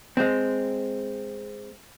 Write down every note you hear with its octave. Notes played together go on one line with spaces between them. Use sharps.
G#3 C4